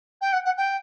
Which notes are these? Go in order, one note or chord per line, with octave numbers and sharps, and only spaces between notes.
G5
F#5
F#5
G5